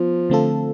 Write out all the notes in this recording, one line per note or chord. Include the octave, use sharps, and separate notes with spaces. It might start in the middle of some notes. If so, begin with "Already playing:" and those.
Already playing: F3 B3 F4
D3 A3 C4 F4 A4